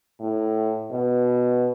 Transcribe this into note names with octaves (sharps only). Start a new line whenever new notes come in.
A2
B2